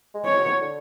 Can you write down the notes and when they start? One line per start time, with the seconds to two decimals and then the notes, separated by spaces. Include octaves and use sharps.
0.14 G#3
0.26 C#5
0.37 F#3
0.61 D3